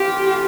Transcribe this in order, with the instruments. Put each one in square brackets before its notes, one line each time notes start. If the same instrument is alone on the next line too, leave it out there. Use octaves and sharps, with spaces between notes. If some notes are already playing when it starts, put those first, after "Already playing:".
Already playing: [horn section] E3 A3 C4 F4 [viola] G4